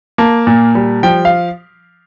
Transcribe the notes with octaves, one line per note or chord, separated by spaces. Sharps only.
A#3 A5
A#2
G3
F3 G5
F5